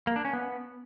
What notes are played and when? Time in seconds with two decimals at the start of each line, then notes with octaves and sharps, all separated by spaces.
0.07 A#3
0.16 D4
0.25 C#4
0.33 B3